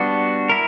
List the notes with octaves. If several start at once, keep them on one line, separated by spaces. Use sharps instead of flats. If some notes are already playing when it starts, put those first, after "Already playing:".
Already playing: G3 B3 D4 F#4
E4 A#4